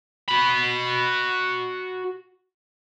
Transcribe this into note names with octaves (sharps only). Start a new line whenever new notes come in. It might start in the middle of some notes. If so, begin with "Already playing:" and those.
F#4 B5